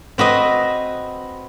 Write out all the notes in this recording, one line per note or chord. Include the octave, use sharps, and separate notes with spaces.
C4 F#4 B4 D#5